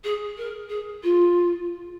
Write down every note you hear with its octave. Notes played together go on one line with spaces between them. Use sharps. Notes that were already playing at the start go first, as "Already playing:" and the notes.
G#4
A#4
G#4
F4